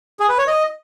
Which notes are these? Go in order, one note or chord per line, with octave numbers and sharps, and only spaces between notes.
G#4
B4
C#5
D#5